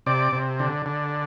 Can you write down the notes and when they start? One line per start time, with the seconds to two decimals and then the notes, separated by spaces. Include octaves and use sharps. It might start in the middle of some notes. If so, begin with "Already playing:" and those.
0.06 C3 D5
0.32 C3
0.60 D3
0.86 D3